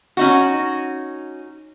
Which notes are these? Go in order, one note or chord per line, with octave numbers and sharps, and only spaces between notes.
C#4 D#4 F#4